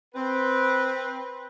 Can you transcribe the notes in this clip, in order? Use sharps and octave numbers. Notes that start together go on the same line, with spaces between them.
C4 B4